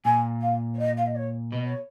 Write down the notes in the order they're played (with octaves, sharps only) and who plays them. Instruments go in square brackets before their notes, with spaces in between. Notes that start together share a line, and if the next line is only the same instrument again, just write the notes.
[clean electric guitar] A#2 [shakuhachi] G#5
[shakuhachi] F5
C#5
D#5
F5
D#5
C#5
[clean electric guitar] B2 [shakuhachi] D#5
[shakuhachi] C#5